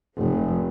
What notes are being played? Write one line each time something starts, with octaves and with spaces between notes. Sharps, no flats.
F1